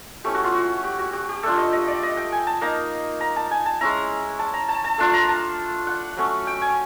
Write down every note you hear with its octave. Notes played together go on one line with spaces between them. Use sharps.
A3 C#4 E4 G4
F#4
F4
F#4
G4
F#4
G4
G4
A3 D4 F4 A4
D#5
D#5
D5
D#5
G5
G#5
A5
A#3 D#4 A#5
A#5
A5
G#5
A5
G#3 C#4 E4 A#5
A5
A#5
A5
A5
A3 D4 F4 A5
A#5
A5
F#5
F#3 A3 C#4
G5
G#5